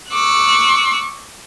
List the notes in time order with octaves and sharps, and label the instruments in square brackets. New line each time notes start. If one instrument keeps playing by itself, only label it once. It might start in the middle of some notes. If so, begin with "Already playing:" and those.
[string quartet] C#6 D6 E6 F#6